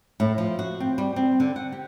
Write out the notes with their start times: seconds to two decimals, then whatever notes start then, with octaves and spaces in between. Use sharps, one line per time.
0.20 A2
0.38 F3
0.59 F#4
0.80 C4
0.98 G3
1.16 C4
1.40 D3
1.56 F#5
1.72 G4